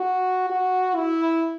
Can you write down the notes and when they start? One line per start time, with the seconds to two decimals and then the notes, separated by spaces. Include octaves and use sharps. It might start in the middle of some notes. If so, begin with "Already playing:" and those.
Already playing: F#4
0.50 F#4
0.96 E4